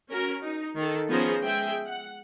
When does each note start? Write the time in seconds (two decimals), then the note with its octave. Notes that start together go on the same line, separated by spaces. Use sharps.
0.10 C#4 F#4 A#4
0.42 D#4
0.77 D#3 A4
1.09 F3 B3 C#4 G#4 C5 A#5
1.43 G#3 G#4 E5 G5
1.87 F#5